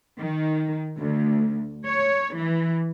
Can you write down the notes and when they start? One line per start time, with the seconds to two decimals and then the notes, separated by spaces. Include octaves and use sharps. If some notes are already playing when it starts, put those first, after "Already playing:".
0.18 D#3
0.99 D2
1.87 C#5
2.35 E3